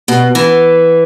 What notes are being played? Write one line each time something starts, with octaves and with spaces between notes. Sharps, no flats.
B2
E3